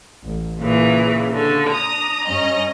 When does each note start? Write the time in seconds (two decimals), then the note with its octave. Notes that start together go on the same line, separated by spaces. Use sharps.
0.23 A1
0.59 A#2 C#3 E3
1.32 D3
1.69 D4 A#5 D#6
2.27 G2 C#4 D#5